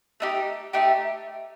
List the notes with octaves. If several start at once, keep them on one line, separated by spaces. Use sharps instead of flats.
A3 D#4 G4
A3 D#4 G4